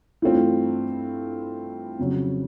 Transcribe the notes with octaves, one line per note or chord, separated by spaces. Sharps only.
G2 E3 A3 C4 F4
F2 C#3 F#3